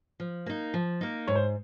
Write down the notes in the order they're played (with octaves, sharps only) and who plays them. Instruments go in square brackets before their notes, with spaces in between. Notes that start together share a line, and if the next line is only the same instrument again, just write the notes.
[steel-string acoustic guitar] F3
A#3 D#4
F3
A#3 D#4
[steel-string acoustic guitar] G#2 [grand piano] C#5
[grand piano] C5